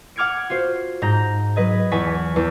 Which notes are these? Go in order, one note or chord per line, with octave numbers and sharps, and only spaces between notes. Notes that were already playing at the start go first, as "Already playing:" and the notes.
F#5 D6 F6 G#6 C#7 D7
F4 F#4 C5
G#2 A#5 G6
F#3 B4 D#5 G#6
E2 F#5 G#5 A5 C#6 B6
E2